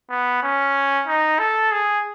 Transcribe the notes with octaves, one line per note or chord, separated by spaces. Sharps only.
B3
C#4
D#4
A4
G#4